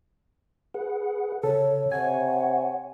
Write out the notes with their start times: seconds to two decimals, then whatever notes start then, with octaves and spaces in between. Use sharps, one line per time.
0.74 G#4 B4 F#5
1.43 C#3 A4 C#5
1.92 C3 C#5 F#5 G#5